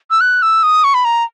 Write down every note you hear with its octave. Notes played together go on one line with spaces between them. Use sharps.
E6
F#6
E6
D#6
C#6
B5
A#5